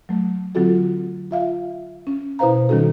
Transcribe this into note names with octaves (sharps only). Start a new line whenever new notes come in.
F#3 A3
D3 F#3 C4 F4 F#4 A4
F4 E5 F5
C#4
B2 E4 B4 C5 F5 A#5
D#3 G3 C#4 D#4 F#4 A4